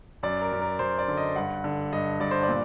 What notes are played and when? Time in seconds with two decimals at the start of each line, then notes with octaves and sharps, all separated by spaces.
0.23 F#2 D5
0.42 A#4
0.52 F#2
0.61 A#4
0.79 F#2 C5
0.99 D5
1.08 D3
1.17 D#5
1.36 G2 F#5
1.64 D3
1.92 G2 D#5
2.20 G2 D5
2.31 C5
2.43 D5
2.49 A#2